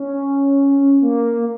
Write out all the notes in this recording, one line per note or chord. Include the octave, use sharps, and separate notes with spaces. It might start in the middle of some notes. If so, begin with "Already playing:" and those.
Already playing: C#4
A#3